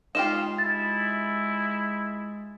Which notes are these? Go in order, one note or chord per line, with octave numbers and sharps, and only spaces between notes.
G#3 D#4 F4 G4 F5 E7
E4 A6